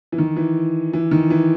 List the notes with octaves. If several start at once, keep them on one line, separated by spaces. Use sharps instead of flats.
E3
D#3
E3
E3
D#3
E3